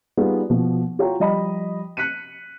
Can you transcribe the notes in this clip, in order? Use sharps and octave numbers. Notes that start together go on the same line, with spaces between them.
G3 B3 D#4 F4 G#4
B2 F3
F4 F#4 C#5 G5 A#5
F3 G3 D#5 G5 B5
F#6 B6 C#7 D#7